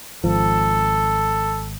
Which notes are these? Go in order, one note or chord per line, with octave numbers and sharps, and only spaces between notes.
G#1 F3 A4